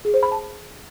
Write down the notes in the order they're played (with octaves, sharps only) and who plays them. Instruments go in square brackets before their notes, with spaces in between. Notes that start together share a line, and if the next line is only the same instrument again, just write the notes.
[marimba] G#4
C5
B5
A5